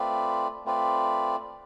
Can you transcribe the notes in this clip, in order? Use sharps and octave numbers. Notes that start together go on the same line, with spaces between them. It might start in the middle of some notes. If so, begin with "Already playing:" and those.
Already playing: A3 C4 F4 B4 D5
A3 C4 F4 B4 D5